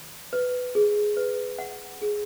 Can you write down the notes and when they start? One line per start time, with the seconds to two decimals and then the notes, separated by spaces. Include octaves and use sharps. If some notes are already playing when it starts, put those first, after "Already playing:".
Already playing: B5
0.33 B4
0.75 G#4
1.17 B4
1.59 F#5
2.02 G#4